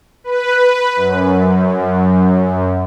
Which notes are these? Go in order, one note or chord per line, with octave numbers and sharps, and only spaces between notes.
B4
F#2